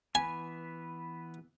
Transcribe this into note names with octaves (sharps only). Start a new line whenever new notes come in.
E3 B3 B4 G#5